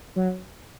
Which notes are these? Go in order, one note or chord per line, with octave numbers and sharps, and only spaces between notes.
F#3